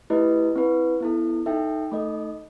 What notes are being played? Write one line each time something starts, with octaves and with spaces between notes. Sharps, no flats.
A3 E4 G4 B4 D#5
C4 E4 B4
B3 E4 A4
D#4 A4 E5 G5
A3 D#4 A4 D#5